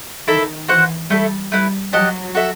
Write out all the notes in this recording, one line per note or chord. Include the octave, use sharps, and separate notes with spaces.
D#3 E4 A4 E5
E3 F#4 C5 F#5
G3 A3 E4 A4
G3 A3 E4 B4
F#3 G4 D#5 F#5 A5
F#4 A4 E5